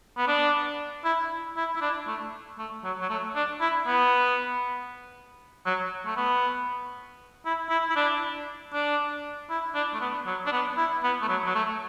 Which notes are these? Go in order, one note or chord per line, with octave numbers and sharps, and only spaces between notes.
B3
D4
E4
E4
E4
D4
A3
A3
F#3
F#3
A3
D4
E4
B3
F#3
A3
B3
E4
E4
E4
D4
D4
E4
D4
A3
B3
F#3
D4
B3
E4
B3
A3
F#3
F#3
A3